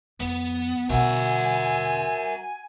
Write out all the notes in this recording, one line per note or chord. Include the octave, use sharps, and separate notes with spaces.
F2 B3
B2 D3 F#4 A#4 E5 G#5